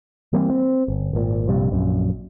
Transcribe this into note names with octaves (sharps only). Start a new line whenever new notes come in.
E3 G3 A#3 C4
C4
G1
G#1 A#2
A#1 G2 C3 G3
A#1 F#2